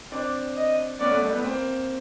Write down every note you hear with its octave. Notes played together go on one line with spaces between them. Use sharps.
C4 D4 D5
D#5
B3 C#4 D5
A3 B3
G3 A3
A3 B3
A#3 C4